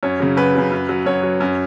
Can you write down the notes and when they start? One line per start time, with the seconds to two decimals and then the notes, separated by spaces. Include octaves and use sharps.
0.03 F#2 C#5
0.20 C#3 F#3
0.37 F#2 B4
0.54 C#3 F#3
0.72 F#2
0.89 F#3
1.06 F#2 C#5
1.23 F#3
1.40 F#2